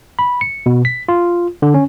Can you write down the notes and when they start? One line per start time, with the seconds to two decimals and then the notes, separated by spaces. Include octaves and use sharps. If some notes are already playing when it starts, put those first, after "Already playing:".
0.19 B5
0.41 C#7
0.66 B2
0.85 B6
1.09 F4
1.62 D3
1.74 C#4